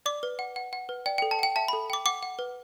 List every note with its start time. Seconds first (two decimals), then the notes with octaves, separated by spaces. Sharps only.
0.06 D5 D6
0.23 B4
0.39 F#5
0.56 F#5
0.73 F#5
0.89 B4
1.06 D5 G5
1.18 G5
1.22 A4
1.31 A5
1.39 F#5 G5
1.56 E5 A5
1.68 B5
1.73 A4
1.90 G5 D6
2.06 F#5 D6
2.23 F#5
2.39 B4